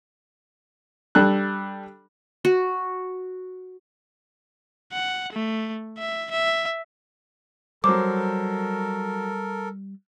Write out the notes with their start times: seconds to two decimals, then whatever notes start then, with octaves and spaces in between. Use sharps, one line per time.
1.15 G3 D4 A4 F#6
2.45 F#4
4.92 F#5
5.33 A3
5.98 E5
6.31 E5
7.84 F#3 G3 A4 A#4 C5 D6